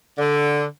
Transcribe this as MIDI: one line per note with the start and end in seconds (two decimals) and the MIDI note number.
0.18 0.64 50